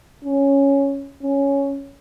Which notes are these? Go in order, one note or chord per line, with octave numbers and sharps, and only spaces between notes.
C#4
C#4